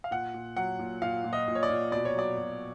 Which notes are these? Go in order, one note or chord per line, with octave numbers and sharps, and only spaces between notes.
F5
A#2 F#5
A#2
F#3 F#5
A#2
A#2 F5
A#2
D#5
A#2
C#5
D5
A#2
B2 D5
C#5
F#3 D5
B2